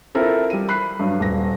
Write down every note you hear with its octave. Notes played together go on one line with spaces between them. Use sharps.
C4 E4 F4 A4 A#4
G3 D#7
B5 F#6 C7
G2 F#3
D#1 A#6